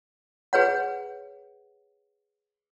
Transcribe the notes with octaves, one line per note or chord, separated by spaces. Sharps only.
G#4 B4 C#5 F#5